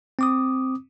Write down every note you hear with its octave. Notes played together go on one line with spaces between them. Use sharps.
C4 D6 D#6